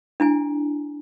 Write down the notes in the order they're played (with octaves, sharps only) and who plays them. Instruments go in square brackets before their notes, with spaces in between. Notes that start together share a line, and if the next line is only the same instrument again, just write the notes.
[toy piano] D4 E4 G#5